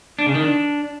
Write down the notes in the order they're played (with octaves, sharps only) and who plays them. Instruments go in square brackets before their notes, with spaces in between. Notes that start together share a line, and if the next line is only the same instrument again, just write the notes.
[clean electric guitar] D4
C#3
D#3
D4